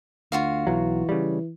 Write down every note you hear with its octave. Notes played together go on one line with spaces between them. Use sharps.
D2 F4 F#4 F5
B1 E3 F#3
C#3 G3